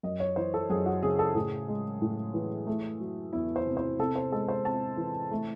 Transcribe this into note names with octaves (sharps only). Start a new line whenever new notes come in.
F#2 D#5
C#5
E3 C5
A4
F#2 G#4
F#4
C#3 G#4
A4
A2 G#4
G#3
A2
E3
A3
F#3
E2 E4
C5
C3
C5
C3 A4
C5
G#3 A4
C5
C3 A5
E3
A3